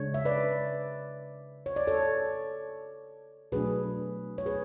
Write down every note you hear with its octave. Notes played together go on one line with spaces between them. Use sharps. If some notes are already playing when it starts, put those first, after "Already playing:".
Already playing: C#3 G#3 D4 C#5
E5
B4 D5
C#5
D5
A4 C#5
B2 F#3 A3 D4 G#4 B4
C#5
G#4 B4